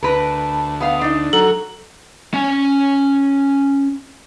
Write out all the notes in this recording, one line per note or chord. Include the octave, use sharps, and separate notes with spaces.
D2 A#4 B4 A5
B3 F5 D#6
D4 D#4
F#3 A4 A#5
C#4 G#5